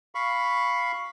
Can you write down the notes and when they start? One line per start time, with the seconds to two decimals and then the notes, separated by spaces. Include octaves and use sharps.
0.15 F5 B5 C#6